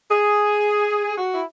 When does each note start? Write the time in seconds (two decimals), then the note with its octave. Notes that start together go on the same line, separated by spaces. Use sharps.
0.11 G#4
1.18 F#4
1.33 E4